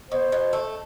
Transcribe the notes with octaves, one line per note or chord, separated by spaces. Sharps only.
B2 C5
B2
A3